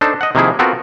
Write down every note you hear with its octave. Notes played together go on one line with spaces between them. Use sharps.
D4 D#4 A4 C5
D#5 F#5
C3 D#3 F3 A#3 E4 G#4
B3 C4 F4 F#4 A4 A#4